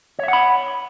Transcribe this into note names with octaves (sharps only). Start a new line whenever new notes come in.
C#5 E5 F#5 B5